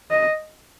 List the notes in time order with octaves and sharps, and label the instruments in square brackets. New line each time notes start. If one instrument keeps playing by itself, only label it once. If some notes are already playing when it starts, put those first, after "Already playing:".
[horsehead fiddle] D#5